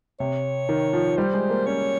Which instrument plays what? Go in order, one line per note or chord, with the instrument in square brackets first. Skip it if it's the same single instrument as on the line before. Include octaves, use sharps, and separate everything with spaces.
[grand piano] C3 [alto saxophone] C#5
[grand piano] D#3
F3
[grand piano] G3 [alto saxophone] C5
[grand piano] G#3
A#3
[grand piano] C#4 [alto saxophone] C#5